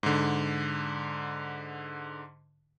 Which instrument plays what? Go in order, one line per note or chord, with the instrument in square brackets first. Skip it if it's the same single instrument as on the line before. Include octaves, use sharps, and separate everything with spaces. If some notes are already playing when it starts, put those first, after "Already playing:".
[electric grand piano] G#2 D3